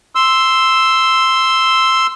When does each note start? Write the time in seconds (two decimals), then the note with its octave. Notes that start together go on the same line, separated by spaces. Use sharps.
0.15 C6 E6